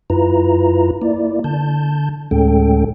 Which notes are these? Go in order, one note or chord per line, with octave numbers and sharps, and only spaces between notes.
F#2 E4 F4 B4 A#5
A#3 E4 D5
D3 A5 G6
D2 A2 G#3 C#4 A4 G5